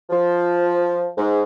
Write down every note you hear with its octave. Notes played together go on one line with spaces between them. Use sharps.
F3
G#2